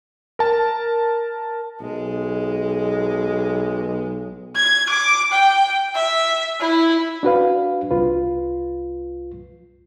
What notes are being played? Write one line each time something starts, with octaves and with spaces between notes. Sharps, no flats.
A#4 A5
B1 G#3
G#6
D6
G5
E5
E4
D4 F#4 B4 F5
C2 F4 B4